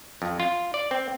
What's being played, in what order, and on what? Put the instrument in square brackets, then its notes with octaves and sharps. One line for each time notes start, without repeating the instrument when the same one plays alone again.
[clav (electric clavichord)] F2
F4
D5
C4